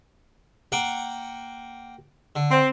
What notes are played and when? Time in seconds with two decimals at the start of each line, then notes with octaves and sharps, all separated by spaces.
0.72 A#3 F#5 G5
2.36 D3
2.51 C4